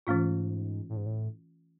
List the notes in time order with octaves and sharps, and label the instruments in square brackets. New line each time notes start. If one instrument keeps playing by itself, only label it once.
[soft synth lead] G#2 [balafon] E3 A3 C#4 F4
[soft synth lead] A2
G#2
A2